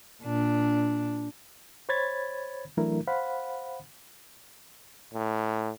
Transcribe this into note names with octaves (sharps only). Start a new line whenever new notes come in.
A#2 D4
C5 C#5 B5 G#6 A6
E3 F#3 A3 D4 E4 A#4
C5 F5 F#5 B5
A2